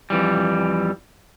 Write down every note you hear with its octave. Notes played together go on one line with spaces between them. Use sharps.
F2 E3 G3